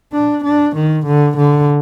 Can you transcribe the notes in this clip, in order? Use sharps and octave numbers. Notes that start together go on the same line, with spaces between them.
D4
D4
D#3
D3
D3